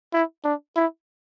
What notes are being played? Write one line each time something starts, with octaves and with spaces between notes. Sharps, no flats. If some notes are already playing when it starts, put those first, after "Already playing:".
E4
D4
E4